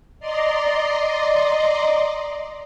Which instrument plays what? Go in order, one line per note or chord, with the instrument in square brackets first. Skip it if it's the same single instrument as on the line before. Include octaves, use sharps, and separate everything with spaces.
[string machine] D5 D#5 A#5 C6